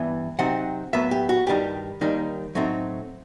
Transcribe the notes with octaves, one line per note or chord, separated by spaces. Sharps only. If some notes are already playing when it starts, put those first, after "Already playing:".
Already playing: G2 E3 B3
C3 F#3 C4 D#4 F#5
A2 F#3 B3 E5
G4
F#4
G2 D#3 G3 D#4 G4
D#2 D#3 G3 D#4
A2 F#3 A3 C4 D#4